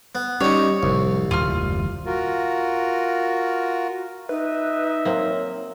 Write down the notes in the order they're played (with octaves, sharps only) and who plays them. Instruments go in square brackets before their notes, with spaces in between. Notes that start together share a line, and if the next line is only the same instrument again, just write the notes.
[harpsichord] B3
[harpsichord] G3 D#4 [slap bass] C#4 [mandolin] C#5
[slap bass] F1 A2 [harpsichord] C2
[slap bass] D#1 D#2 [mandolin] F4 F6
[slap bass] F#1 D#2 A3
[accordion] F4 F#4 A#4
[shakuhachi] D#4 [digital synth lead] B4 [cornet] E5
[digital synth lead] F#3 [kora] A#3 C4